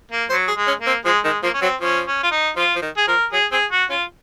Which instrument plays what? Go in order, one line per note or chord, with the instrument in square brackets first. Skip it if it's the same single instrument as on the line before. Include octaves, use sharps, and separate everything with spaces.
[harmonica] A#3
[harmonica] F#3 [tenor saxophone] C5
[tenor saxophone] G#4
[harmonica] G#3
[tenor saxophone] C#4
[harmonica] A#3
[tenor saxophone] C4
[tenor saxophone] F3 [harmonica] G#3
[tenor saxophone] D#3 [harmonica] G#3
[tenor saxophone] F3 [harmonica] A#3
[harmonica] C#4
[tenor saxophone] F#3 [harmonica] C4
[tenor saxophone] F3 [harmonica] C#4
[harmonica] C#4
F4
D#4
[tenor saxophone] F3 [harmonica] F4
[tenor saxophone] F3
D#3
[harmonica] G#4
[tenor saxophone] F3 [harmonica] A#4
[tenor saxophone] F#3 [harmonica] G#4
[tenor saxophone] C4 [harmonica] G#4
[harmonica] F#4
[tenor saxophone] C#4 [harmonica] F4